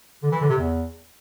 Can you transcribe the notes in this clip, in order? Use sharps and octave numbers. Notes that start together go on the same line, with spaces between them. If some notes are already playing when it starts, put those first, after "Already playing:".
D3
E3
D3
C3
E2